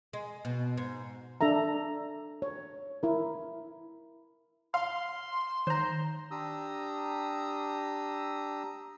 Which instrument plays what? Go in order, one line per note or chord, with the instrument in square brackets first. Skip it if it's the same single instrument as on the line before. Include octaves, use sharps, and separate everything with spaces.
[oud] G#3
B2
G#2
[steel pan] D4 A4 E5 A#5
C#5
E4 A#4
[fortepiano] F5 [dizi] C6
[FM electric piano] D#3 [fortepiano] C5 A#5
[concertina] D4 G4 A#5 D#6 E6